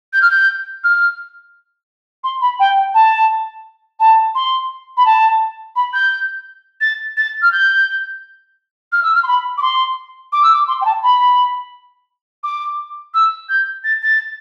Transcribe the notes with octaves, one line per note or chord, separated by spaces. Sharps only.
G6
F6
G6
F6
C6
B5
G5
A5
A5
C6
B5
A5
B5
G6
A6
A6
F6
G6
F6
E6
F6
C6
B5
D6
C6
D6
E6
D6
C6
G5
A5
B5
D6
E6
G6
A6
A6